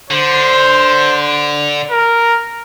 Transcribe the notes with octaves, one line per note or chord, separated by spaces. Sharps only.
D3 C5
A#4